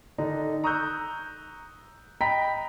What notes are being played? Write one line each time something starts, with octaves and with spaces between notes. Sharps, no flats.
D3 D#3 D4 D#4
A#5 C#6 D#6 E6 F#6 G6
D#5 G5 A#5 B5 B6